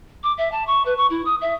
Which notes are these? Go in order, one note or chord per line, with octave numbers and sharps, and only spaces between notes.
D6
E5
A5
C#6
B4
C#6
E4
D#6
E5